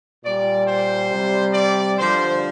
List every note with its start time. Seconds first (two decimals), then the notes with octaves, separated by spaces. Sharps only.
0.24 A#2 G3 D5
0.67 C5
1.11 C3 G3
1.53 D5
1.97 G2 D3 F3 C5